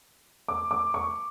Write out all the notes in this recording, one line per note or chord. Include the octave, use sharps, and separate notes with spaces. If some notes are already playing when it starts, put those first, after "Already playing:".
D6
D6
C#6